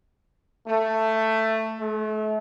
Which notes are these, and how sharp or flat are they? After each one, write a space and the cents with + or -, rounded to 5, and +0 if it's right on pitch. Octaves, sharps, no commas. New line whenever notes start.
A3 +10
A3 -35